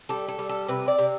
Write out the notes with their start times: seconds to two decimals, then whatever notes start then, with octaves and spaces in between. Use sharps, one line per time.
0.09 G3 A4
0.28 A4
0.39 G3
0.49 A4
0.68 C3 B4
0.88 D5
0.98 C3